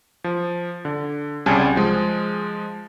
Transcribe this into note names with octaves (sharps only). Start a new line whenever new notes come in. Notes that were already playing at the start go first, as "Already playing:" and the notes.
F3
D3
C2 C#3 G3 G#5 A5
F3 G#3